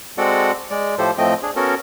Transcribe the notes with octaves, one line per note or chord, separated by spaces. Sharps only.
G#3 C4 F#4 A4 D5 F#5
G#3 D5
A2 F3 G4 A4 C5
A2 F3 A3 C4 D#5 G5
D4 G#4
B3 C#4 F#4 A4 A#4